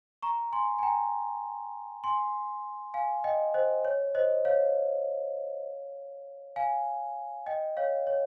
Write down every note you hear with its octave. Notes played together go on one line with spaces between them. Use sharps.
A#5 C#6
G#5 C6
G#5
G5 A#5
G#5 C6
F5 G#5
D#5 G5
C5 D#5
C#5
C5 D#5
C#5 F5
F5 G#5
D#5 G5
C#5 F5
C#5